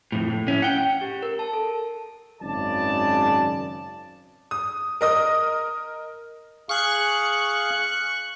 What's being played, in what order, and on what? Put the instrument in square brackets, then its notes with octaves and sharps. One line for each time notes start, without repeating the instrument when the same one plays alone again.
[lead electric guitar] F2 A2
A2
C#4 E4
F#5 G5
[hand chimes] G4
A#4
A5
A4
[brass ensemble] G#1 F#2 C#3 D5 A5
[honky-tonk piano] D#6
A#4 D#5 D#6
[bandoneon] G#4 F5 [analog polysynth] C#6 F#6